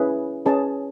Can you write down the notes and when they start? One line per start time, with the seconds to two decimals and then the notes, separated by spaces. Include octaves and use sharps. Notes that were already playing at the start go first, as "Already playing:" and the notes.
Already playing: C#4 E4 G#4 B4
0.46 C#4 G#4 B4 A5